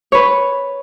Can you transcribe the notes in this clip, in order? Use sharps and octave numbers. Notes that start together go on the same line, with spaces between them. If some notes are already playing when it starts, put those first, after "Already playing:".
B4 C#5